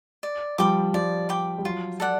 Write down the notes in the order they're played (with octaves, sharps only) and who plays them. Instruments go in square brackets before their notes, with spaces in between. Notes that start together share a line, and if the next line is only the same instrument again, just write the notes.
[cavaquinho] D5
[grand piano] F3 G3 [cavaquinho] G5 B5 D6
[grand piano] F3 G3 [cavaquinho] D5
[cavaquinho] G5 B5 D6
[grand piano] G3
[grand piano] F#3 [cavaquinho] F4
[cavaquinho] A4 D5 F#5